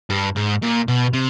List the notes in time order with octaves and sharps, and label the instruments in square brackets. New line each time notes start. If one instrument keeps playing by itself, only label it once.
[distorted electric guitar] G2
G#2
A#2
B2
C3